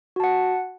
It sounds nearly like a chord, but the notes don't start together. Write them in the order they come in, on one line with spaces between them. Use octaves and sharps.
F#4 A5 F#5